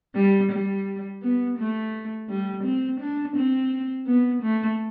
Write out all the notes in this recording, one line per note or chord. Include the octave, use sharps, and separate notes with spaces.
G3
G3
B3
A3
G3
C4
D4
C4
B3
A3